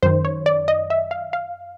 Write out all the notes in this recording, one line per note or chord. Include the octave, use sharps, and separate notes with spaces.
F#2 D#3 C5
C#5
D5
D#5
E5
F5
F5